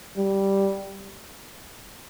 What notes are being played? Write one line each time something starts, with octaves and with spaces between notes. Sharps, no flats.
G3